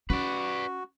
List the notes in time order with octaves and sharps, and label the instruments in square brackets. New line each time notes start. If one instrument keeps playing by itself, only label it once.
[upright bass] C#4 [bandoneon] F#4 [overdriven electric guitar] B4 D5